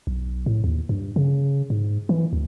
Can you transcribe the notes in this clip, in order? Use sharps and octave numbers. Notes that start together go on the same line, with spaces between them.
B1
A2
D#2
G2
C#3
G#2
E3
D2